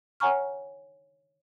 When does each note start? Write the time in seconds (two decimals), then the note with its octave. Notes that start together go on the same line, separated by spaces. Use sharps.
0.20 C#5 F#5 G#5 A#5 C#6 F6